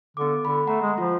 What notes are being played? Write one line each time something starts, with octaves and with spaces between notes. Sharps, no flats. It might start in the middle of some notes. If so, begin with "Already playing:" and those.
D3 B3 D6
D3 B5
A3 F#5 A#5
G#3
F3 F4